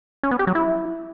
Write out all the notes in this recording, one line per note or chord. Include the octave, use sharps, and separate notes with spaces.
C#4
B3
G4
F#3
E4